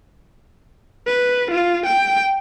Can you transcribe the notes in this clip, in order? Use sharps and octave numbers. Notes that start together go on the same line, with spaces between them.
B4
F4
G5